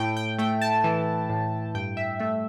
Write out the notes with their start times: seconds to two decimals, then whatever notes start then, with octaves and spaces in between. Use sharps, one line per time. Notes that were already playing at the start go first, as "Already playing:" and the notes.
Already playing: A2 G5
0.17 G5
0.38 A3 G5
0.61 A5
0.84 E3
1.29 A2
1.75 G2 G5
1.97 E5
2.20 A3 E5